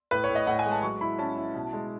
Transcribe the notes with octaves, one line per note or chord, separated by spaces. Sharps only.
A2 B4
C#5
A2
D#5
A2 F#5
G#5
G#3
A5
F#3 C#6
E4 B5
C#4 A5
E4
B2
G#3